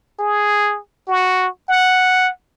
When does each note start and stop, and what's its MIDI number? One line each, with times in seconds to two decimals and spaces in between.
0.19 0.79 68
1.08 1.48 66
1.69 2.31 78